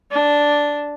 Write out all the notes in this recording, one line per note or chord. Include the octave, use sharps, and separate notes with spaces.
D4